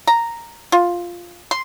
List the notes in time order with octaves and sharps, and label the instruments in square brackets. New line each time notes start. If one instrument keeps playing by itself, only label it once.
[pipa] A#5
F4
C6